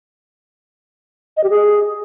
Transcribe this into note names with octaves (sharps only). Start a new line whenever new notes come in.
D#5
G4
G#4